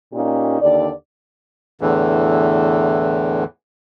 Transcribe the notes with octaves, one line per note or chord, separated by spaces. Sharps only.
A#2 A#3 C#4 D#4 G4
D#2 D3 D5
E2 A2 D3 E3